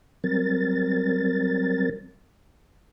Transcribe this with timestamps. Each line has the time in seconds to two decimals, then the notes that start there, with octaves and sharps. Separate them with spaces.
0.24 F#3 G3 C4 A#4 A6